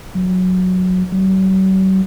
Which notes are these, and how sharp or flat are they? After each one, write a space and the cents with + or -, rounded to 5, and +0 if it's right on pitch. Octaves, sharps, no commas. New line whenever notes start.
F#3 -10
F#3 +45